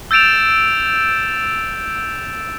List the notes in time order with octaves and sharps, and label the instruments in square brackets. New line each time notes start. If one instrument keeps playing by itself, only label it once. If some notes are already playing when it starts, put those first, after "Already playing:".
[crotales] E6 G6 A6 D7 E7 F7